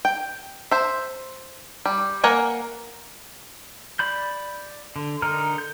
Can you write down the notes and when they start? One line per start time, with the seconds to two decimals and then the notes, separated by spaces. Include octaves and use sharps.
0.05 G5
0.71 C5 E5
1.85 G3
2.24 A#3 A#4 F#5 G#5
3.99 D5 B5 G6
4.96 D3
5.22 D3 D#4 A#4 A#5 F6
5.58 G6